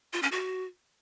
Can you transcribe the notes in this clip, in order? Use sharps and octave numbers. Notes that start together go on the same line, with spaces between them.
F4
C#4
F#4